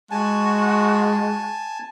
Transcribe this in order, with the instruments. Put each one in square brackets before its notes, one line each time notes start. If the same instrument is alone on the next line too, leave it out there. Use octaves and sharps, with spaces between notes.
[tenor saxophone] G#3 [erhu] F#4 [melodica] G#5 A5